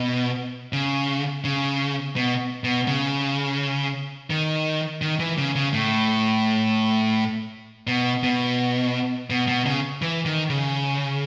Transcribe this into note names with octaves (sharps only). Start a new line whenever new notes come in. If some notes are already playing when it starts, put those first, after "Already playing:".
Already playing: B2
C#3
C#3
B2
B2
C#3
D#3
D#3
E3
C#3
C#3
A2
B2
B2
B2
B2
C#3
E3
D#3
C#3